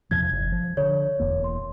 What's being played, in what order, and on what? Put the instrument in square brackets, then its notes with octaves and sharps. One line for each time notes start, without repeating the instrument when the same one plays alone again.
[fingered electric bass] E2 C3 F3 [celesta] G#6
[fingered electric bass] G1
F3
[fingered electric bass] D3 [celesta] C#5
[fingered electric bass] E1 E2 A#3
[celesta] C6